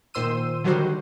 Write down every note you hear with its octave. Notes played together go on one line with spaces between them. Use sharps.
A#2 D#3 C5 C6 E6 D#7
D3 D#3 F#3 G3 F#4 C5